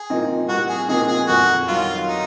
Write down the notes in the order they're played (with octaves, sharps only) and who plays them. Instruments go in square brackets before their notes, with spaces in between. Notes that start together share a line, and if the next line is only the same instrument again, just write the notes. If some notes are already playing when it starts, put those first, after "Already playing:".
Already playing: [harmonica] G#4
[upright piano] A#2 F3 C4 D#4
[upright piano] C2 [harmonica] F#4
[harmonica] G#4
[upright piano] A#2 F3 C4 D#4 [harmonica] G#4
[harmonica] G#4
[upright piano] F2 [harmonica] F#4
[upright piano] D#3 F#3 [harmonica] F4
[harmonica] D#4